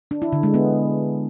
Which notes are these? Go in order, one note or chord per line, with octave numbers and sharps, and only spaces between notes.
D4
E4
D3
G#3
B3